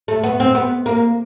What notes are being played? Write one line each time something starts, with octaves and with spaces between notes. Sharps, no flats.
A3
B3
C4
B3
A#3